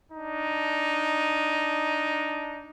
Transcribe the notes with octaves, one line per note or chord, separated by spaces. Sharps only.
D4 D#4